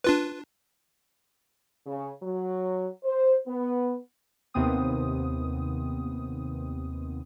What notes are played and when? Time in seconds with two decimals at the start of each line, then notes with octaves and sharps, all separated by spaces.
0.04 D4 F4 B4
1.87 C#3
2.23 F#3
3.04 C5
3.47 B3
4.54 D#2 C3 B3 C4 D#6